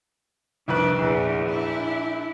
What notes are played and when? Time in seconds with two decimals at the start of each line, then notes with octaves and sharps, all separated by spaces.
0.68 C2 F2 D#3 D4 B4
0.99 A#1 E2 E3
1.48 D4 E4